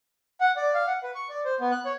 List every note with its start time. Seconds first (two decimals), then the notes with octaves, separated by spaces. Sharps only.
0.41 F#5
0.57 D5
0.74 F5
0.87 F#5
1.03 B4
1.15 C#6
1.29 D5
1.45 C5
1.60 B3
1.72 F#6
1.85 C#5